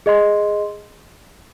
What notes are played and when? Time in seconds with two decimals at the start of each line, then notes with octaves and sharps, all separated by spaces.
0.06 G#4 D#5 C6